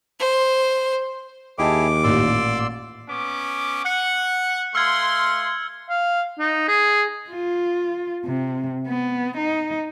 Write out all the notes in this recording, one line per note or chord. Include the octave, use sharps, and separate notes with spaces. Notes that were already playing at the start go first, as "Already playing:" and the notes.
C5
D#2 E4 G4 G#4 D#5 A5 D6
A1 A#2 D5 C6 E6
B3 C#4 D6
F#5 F#6 C#7
A3 F5 C6 E6 F6 G#6
F5
D#4
G#4
F4
C3
B3
D#4